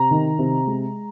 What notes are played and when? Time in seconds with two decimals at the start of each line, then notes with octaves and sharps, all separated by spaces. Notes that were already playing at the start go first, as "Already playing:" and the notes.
Already playing: C3 A#5
0.11 D#3
0.39 C3
0.67 G#3